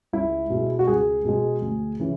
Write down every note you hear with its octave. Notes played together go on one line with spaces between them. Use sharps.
C#2 E4
B2 G#3
F#4
C#2 G#4
B2 G#3
D2
C#3 E3